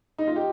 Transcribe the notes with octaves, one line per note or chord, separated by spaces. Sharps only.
D#4
F4
G4